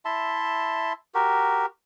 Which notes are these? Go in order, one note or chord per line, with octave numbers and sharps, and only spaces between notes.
E4 E5 A5 C6
F#4 G4 A#4